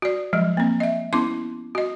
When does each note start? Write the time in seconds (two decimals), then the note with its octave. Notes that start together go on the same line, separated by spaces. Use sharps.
0.02 F#4 D5
0.33 F3 F#3 G#3
0.57 A#3 C4
0.80 D#5 E5
1.13 B3 C#4 E4 C6 D6
1.75 F#4 D#5